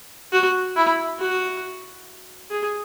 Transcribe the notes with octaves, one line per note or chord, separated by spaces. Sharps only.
F#4
E4
F#4
G#4